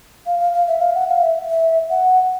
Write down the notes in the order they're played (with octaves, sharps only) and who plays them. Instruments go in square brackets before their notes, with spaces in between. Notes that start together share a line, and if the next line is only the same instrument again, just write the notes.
[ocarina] F5
F5
F5
E5
F5
F#5
F5
E5
E5
F#5